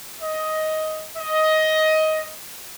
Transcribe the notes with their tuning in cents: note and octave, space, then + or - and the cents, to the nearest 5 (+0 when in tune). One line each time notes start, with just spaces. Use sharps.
D#5 +10
D#5 +15